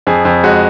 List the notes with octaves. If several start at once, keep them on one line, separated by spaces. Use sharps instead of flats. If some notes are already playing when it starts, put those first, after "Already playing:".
F2 G#4
F2
G#3 F#4